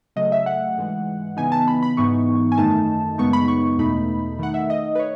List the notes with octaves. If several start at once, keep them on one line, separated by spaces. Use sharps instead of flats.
C#3 F#3 A3 D#5
E5
F#5
G#2 E3 G#3
C#3 E3 B3 D#4 G#5
A5
B5
B5
G#2 E3 B3 D#4 C#6
G#5
F#2 D#3 A3 D#4 A5
F#2 C#3 G#3 B3 D#4 C#6
B5
C#6
E2 B2 A3 D#4 B5
D#3 A3 D#4 F#5
E5
D#5
B4
C#5